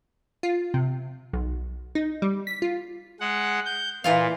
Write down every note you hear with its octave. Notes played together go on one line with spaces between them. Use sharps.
F4
C3
B1
D#4
G3
B6
F4
G#3 F#5
G6
A#2 E3 F4 F5